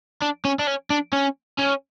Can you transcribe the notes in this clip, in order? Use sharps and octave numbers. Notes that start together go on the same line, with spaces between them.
D4
C#4
D4
C#4
D4
C#4
C#4